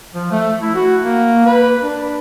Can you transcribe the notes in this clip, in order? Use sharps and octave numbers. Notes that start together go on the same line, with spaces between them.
F3
A3
E4
F#4
A#3
B4
D4